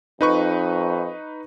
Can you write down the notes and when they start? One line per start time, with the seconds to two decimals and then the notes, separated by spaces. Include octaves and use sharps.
0.21 F2 D#4 B4 C#6